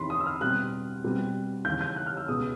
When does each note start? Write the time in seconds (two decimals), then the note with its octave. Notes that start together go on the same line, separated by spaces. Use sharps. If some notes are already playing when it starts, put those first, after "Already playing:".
Already playing: E2 C3 D#3 B5 C6
0.10 D#6
0.20 E6
0.26 F6
0.41 B2 G3 C4 F#6
1.04 B2 G3 C4
1.65 D#2 C#3 E3 G6
1.81 G6
1.96 F#6
2.06 F6
2.17 E6
2.28 C#2 B2 G#3 B3 D#6